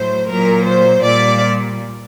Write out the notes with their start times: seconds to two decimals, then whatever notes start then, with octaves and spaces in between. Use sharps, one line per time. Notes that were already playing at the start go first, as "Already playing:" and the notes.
Already playing: A2 F#3 C5
0.30 A#2 F#3 A#4
0.67 C5
1.03 A#2 G3 D5